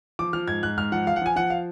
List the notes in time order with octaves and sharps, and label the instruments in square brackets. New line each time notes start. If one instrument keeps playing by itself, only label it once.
[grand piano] F3 D6
F3 F6
G#2 G#6
G#2 F#6
G#2 F6
F3 F#5
F3 F5
F#5
F3 G#5
F3 F#5
F5